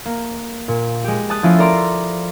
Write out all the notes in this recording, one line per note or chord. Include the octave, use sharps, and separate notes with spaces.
A#3
A#2
G#3 G4
A5 D#6 F#6
F3 A3 C#4 E4 F4
A4 A#4 D5 A#5 C6 D6